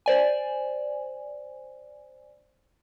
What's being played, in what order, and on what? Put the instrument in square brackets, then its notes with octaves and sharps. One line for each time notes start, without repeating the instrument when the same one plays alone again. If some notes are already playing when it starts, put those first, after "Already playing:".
[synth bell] C5 D5 G#5